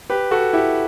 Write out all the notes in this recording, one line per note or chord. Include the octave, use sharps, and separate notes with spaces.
G4 B4
F#4 A4
E4 G4